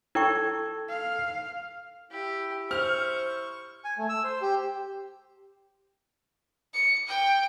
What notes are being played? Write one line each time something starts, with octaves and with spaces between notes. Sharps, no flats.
E4 A4 G5 C#6 E6 G#6
F5
E4 G4
C5 C#6 F6
G#5
A3
E6
C5
G4
C#7
G5